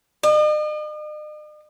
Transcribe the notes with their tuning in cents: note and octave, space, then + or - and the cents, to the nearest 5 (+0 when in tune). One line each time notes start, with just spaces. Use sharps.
D#5 -45